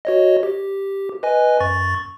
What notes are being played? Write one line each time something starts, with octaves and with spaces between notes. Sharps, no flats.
F#4 C#5 D#5
G4
B4 D#5 G#5
F#2 C#6 A6